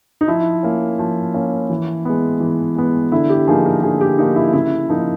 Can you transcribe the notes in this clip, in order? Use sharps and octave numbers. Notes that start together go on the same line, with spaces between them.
D#4
F3 E4
A#3 C#4
F3
A#3 C#4
E3
G#3 B3
E3
G#3 B3
D3 E4
G4
F3 A#3 D#4 G#4
A#4
D3 G#4
G4
F3 A#3 D#4
E4
C#3 E4
F3 A#3 D#4